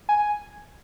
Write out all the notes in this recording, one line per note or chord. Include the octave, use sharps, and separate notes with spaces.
G#5